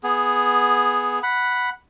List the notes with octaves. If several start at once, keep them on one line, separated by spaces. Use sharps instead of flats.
B3 G#4
F#5 B5